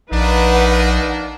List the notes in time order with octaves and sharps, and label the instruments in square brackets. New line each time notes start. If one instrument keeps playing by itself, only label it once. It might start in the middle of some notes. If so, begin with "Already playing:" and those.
[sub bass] A#1 [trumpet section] A#3 D4 [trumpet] D#4 [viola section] B4 F#5